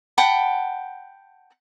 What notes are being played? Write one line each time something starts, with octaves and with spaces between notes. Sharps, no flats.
F#5 G5 A5 B5